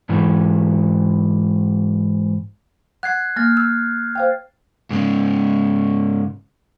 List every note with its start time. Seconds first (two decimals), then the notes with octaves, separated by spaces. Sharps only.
0.09 G#2 E3
3.03 F#5 F#6 G#6 C7
3.36 A#3 F6 A6
3.57 E6
4.15 C5 F5 G5
4.91 G#2 C#3